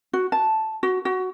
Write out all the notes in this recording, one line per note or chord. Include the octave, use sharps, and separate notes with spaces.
F#4
A5
F#4
F#4